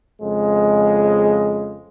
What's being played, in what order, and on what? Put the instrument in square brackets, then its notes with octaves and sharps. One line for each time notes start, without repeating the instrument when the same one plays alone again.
[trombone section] F2 C#3 G#3